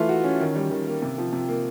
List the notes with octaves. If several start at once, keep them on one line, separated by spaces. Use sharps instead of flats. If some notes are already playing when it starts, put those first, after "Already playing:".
Already playing: E3 A3 F4
F#4
C#4
D#3
G3
D#3
A#3
C3
F3
C3
A#3